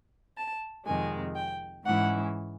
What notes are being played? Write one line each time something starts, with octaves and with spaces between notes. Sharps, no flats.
A5
F2 C3 D#3 G#3 G#5
G5
G#2 E3 G#3 C#4 E4 F#5